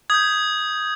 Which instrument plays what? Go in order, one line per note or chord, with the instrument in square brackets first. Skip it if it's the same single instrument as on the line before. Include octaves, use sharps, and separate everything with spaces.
[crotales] D#6 G6 G#6